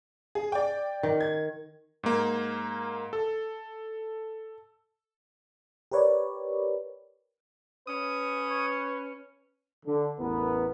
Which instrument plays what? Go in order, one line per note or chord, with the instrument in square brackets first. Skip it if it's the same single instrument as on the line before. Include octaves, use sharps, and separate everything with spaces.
[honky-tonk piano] G#4
D5 G5
[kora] D#3
[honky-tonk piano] G#6
[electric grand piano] G#2 A#3
A4
[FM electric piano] G4 A#4 B4 C#5 D5
[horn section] C#4 [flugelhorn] B4 [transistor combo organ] D#6
[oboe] C#5
[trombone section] D3
A1 E2 B3 A#4 B4